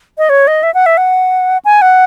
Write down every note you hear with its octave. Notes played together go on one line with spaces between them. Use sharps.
D#5
C#5
D#5
E5
F#5
E5
F#5
G#5
F#5